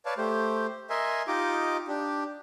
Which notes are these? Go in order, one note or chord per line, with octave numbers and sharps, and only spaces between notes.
B4 C#5 D5 F5 A5
A3 G4 C5
A#4 D#5 E5 G#5 C6
D#4 F4 G4 D#5 D6
D4 G4